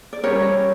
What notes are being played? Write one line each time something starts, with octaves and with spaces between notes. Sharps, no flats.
D5
G3 C#4 G4 A#4 C#5